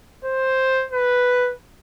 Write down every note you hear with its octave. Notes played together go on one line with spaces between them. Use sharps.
C5
B4